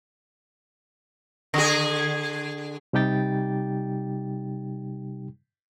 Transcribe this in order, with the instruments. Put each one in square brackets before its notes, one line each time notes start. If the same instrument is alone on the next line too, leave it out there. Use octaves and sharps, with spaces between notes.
[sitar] D3 G#4
[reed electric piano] C3 G3 D#4 G4 G5 A6